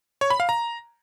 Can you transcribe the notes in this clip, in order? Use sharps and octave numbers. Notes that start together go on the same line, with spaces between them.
C#5
B5
F5
A#5